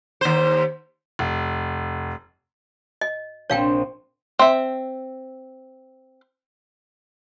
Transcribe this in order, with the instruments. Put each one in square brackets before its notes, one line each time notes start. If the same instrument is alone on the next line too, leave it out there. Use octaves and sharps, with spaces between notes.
[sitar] D#2 C5
[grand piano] F1
[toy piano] D#5
[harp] A#1 C4 [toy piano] C#5 F5 G5
[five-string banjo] C4 E5